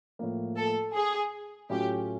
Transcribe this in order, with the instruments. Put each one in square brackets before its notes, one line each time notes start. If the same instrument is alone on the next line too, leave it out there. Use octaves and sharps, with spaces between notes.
[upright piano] A2 F3 A#3
[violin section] A4
G#4
[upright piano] A2 F#3 A3 C#4 F4 [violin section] G4